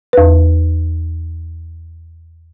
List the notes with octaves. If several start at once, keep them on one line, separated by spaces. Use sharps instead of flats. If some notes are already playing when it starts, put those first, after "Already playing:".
E2 B4